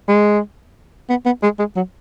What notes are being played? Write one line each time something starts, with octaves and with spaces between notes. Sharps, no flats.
G#3
B3
B3
G#3
G#3
F#3